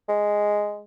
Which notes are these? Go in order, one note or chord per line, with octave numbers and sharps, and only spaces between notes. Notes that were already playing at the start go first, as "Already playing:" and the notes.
G#3